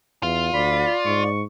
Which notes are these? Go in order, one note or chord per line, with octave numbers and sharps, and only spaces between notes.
E2 F4
D2 D5 B5
G#2 C#6